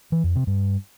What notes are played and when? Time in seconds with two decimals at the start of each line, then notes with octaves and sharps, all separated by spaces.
0.12 E3
0.24 F2
0.35 C3
0.47 G2